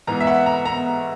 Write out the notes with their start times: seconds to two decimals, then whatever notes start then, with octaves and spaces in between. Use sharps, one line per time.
0.07 G#2 E3 B3 A#5
0.20 E5
0.27 F#5
0.46 A#5
0.65 B3 A#5